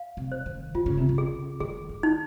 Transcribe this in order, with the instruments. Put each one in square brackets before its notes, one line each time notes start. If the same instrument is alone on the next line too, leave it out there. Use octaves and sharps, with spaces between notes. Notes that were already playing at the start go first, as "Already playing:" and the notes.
Already playing: [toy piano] F5
[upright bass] C3
[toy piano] C5
[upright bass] D#3
[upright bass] D#3 [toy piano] F4
[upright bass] C#3
C3
C#3
[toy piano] G#4
[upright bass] D#3 [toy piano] G#4
[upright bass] D#3
[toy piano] D#4